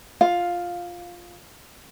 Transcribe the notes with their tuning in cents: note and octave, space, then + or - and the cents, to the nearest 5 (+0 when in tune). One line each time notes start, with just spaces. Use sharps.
F4 +0 F5 +10